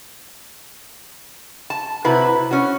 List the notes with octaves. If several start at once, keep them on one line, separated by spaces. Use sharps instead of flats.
A5
C3 E4 F#4 B4
C#4 F#4